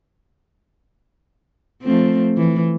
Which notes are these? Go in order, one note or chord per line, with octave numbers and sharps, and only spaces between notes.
F3 A3 C4
E3